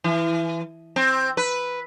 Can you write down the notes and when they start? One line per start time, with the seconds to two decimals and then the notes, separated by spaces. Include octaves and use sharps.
0.04 E3
0.96 C4
1.37 B4